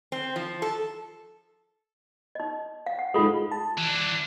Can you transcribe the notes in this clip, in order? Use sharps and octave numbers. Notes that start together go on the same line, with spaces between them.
C4
F3
A4
D#4 D#5
F5
F#5
G#2 G#3 F4 A4
A5
E3 D4